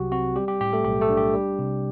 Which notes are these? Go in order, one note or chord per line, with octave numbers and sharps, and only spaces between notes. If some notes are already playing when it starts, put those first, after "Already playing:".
Already playing: C2 C3 F#3 F#4 G4
C4 F#4
G3 G4
G4
A2 G4
A3 A4
B1 G4
A3 A4
D4
G4
G3
C3